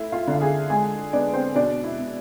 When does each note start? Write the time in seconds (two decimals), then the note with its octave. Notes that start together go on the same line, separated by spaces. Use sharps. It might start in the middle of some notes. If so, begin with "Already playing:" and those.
Already playing: A3 E4 E5
0.12 F4 F5
0.27 D3 F5
0.41 G#4 G#5
0.70 G#3 G#4 G#5
1.13 B3 D4 D5
1.33 C4 C5
1.55 B2 D4 D5
1.83 E4 E5
1.98 B2